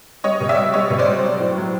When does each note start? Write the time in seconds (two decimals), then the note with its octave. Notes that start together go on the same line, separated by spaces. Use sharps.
0.24 G3 C#5 D#5
0.41 B2
0.49 D5 E5
0.57 G3
0.74 G3 C#5 D#5
0.90 B2
0.98 C5 D5
1.07 G3
1.24 F#3
1.40 A2
1.57 F#3